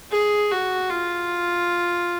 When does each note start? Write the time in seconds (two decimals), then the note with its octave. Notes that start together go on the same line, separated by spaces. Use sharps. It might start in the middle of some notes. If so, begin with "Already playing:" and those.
0.11 G#4
0.51 F#4
0.90 F4